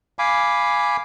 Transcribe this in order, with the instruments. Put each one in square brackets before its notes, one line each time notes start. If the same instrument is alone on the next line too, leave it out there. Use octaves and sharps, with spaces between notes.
[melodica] F5 G#5 B5 D6